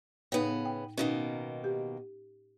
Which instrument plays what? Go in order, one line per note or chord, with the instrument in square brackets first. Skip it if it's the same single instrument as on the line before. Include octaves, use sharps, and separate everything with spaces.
[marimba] A2 D#4 G5 [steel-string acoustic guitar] C#3 B3
[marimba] G5
[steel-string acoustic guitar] B2 D#3 A#3 [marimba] C#4 D#4
[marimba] G4